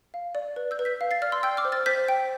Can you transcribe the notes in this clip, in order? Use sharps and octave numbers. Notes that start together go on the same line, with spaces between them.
F5
D5
B4
E6 G6
B4
G6 B6
F5
A6 C7
D5 F6 A6
C6 E6
G5 E6 G6
D6 F6
C5
F6 A6
C5 G6 B6
G5